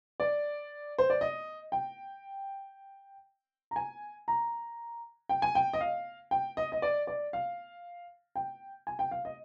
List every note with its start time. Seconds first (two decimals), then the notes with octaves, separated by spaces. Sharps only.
0.20 D5
0.98 C5
1.10 D5
1.21 D#5
1.72 G5
3.71 A#5
3.76 G#5
4.28 A#5
5.29 G5
5.42 G#5
5.55 G5
5.73 D#5
5.81 F5
6.31 G5
6.57 D#5
6.72 D#5
6.82 D5
7.07 D5
7.33 F5
8.36 G5
8.87 G#5
8.99 G5
9.11 F5
9.25 D#5